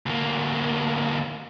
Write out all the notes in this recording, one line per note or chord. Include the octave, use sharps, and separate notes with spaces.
D2 A#3